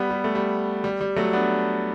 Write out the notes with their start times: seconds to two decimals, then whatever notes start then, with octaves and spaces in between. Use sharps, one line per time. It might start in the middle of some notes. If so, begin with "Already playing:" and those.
Already playing: G3 B3
0.11 G3
0.24 A3
0.35 G3
0.84 G3
1.01 G3
1.16 F#3 A3
1.33 B3 D4